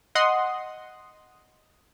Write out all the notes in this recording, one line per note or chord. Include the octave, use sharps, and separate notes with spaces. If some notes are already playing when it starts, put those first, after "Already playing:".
D#5 F#5 C6 D#6